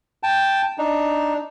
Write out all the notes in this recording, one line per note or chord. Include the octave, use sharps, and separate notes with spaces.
G5 A5
D4 D#4